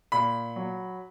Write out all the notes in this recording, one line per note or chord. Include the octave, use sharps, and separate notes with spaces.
A#2 B5
F#3